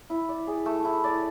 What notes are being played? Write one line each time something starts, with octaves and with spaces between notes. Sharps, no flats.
E4
D5
G#4
A3
E4
D5